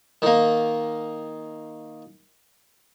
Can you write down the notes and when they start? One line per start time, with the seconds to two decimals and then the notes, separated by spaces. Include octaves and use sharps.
0.22 D#3 A#3